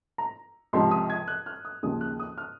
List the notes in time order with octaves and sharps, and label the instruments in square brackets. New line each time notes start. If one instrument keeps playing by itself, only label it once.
[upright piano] A#5
C#2 C3 F3 C6
D#6
G#6
F#6
F6
D#6
D#2 C#3 F3 D#6
F#6
D#6
F6